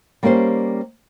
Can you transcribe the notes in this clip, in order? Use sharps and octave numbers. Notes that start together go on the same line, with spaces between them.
G3 A#3 C#4 G4 C5